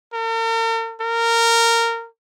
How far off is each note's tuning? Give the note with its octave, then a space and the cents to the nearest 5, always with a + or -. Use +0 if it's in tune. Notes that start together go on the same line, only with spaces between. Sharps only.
A#4 -45
A#4 -15